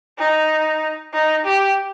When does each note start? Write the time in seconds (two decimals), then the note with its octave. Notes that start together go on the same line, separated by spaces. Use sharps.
0.18 D#4
1.13 D#4
1.44 G4